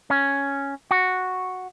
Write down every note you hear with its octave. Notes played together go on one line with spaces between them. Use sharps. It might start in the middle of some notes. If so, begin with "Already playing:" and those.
C#4
F#4